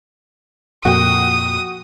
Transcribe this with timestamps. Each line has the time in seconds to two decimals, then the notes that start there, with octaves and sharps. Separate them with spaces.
0.85 F2 A#2 F#4 G5 D#6